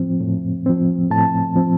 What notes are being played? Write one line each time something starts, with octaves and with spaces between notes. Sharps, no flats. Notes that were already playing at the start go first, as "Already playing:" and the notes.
Already playing: A2 F3 C4
A2
F3 C4
A2 A5
F3 C4